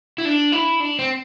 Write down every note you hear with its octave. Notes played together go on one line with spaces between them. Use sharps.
E4
D4
E4
D4
C4